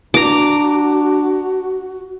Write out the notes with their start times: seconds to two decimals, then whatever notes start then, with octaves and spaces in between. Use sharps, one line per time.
0.14 D4 F#4 A#5 D6